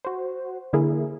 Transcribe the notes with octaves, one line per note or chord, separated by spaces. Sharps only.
F#4 C5
D3 A#3 E4 G#4 A#4